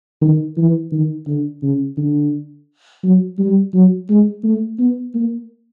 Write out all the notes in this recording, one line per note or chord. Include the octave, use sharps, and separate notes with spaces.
D#3
E3
D#3
D3
C#3
D3
F#3
G3
F#3
G#3
A3
B3
A#3